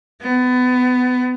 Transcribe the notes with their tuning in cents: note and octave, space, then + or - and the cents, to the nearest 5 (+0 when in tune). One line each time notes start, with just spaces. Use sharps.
B3 +25